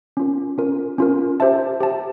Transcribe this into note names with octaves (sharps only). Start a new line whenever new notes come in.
C#4 F4 A#4
C#4 F4 A#4
C#4 F4 A#4
G4 C5 E5 A5
G4 C5 E5 A5